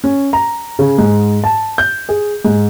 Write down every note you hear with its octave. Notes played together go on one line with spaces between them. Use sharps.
C#4
A#5
C#3
G#2
A5
G6
G#4
G#2